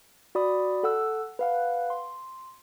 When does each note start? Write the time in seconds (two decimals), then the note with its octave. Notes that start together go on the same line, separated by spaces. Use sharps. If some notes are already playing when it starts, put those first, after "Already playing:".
0.35 F#4 D5 B5 D#6
0.83 A4 F#5 E6
1.39 B4 F5 F#5
1.90 C6